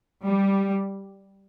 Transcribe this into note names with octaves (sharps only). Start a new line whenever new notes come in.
G3